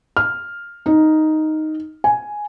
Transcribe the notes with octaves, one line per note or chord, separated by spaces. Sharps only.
F6
D#4
G#5